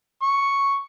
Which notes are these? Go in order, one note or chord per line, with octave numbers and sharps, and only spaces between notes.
C#6